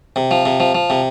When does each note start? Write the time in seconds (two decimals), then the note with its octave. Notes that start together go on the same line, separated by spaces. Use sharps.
0.16 C3
0.31 F3
0.46 C3
0.60 F3
0.75 F3
0.90 C3